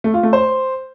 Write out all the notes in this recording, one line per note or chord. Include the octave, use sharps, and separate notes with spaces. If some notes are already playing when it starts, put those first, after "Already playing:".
A3
F4
A3
C5